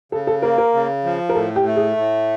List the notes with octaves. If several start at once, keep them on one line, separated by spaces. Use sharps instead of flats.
C#3 A4
A4
A#3 A#4
A#4
C#3
F3
A#4
A2 A4
G4
A3
G#4
A2